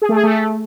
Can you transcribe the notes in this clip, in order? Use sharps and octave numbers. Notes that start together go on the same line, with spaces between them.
G#4
A3
G#4
A3